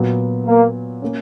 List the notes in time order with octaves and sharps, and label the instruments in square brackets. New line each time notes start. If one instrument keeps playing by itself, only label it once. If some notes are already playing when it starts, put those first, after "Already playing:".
Already playing: [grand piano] A#2 F#3 B3 F#4 B4
[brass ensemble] A#3
[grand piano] A#3 C#4